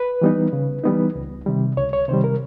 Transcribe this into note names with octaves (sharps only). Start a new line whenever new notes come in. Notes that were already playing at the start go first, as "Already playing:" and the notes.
Already playing: B4
E3 G3 B3 D#4
C#3
E3 G3 B3 D#4
C#2
C3 D#3 G3
C#2 C#5
C#5
C3 D#3 G3 C5
A#4